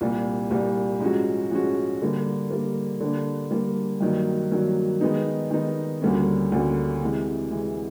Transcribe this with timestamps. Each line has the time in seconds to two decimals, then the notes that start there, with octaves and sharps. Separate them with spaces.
0.01 C2 A#2 G3
0.51 C2 A#2 G3
1.00 G#2 F3 G#3 C#4 F#4
1.51 G#2 F3 G#3 C#4 F#4
2.02 D3 G3 A#3
2.50 D3 G3 A#3
3.00 D3 G3 A#3 D4
3.51 D3 G3 A#3 D4
4.01 G2 D#3 F#3 A#3
4.51 G2 D#3 F#3 A#3
5.01 D#3 G#3 B3 D#4
5.51 D#3 G#3 B3 D#4
6.02 D2 D3 G3 A#3 C#4
6.52 D2 D3 G3 A#3 C#4
7.02 C3 E3 G#3
7.51 C3 E3 G#3